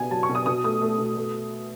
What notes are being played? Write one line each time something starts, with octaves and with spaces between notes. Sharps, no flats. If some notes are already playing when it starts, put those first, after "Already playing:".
Already playing: B2 B3 G#5
F#3 A5
C#6
B2
D#6
B2 D#6
A3 D#6
A3
B2
A3